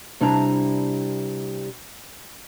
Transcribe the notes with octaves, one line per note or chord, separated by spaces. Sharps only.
C3 G3 D4 E4 A5 A#5